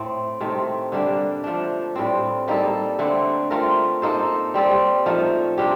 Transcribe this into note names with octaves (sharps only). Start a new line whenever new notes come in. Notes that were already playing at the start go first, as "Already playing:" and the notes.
Already playing: A2 A3 C4
C3 D#3 A3 C4
D3 G3 A#3 D4
F3 A3 D4
A2 G3 C4
G3 A#3 D#4 A4
D3 A3 C4
A3 C4 F4 A#4
A#3 D#4 A4 C5
G3 C4 G4 D5
F3 A3 D#4 A#4
C3 G3 D4 G4